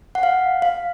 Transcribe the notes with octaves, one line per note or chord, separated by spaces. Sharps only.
F#5
F5
F5